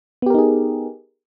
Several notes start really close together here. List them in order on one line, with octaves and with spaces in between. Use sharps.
B3 G4 A#4 D#4 G#4